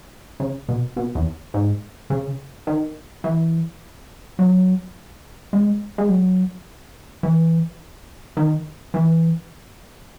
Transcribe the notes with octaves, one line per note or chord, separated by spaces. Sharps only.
C#3
B2
B2
E2
G#2
C#3
D#3
E3
F#3
G#3
G#3
F#3
E3
D#3
E3